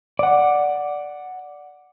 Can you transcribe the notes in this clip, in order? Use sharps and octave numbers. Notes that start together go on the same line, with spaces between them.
D5 F#5